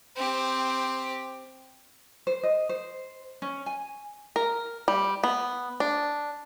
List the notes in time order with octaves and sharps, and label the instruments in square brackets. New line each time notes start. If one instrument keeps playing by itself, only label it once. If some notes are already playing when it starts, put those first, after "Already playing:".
[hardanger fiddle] C4 G4
[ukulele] C5
D#5
C5
C#4
G#5
[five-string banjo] A#4
G3
B3
D4